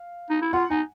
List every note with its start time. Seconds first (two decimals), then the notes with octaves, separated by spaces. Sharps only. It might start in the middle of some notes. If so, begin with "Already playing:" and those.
Already playing: F5
0.30 D#4
0.42 E4
0.53 F4 F#5
0.70 D#4 G#5